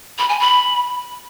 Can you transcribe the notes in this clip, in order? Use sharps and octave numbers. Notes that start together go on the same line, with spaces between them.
B5
G#5
B5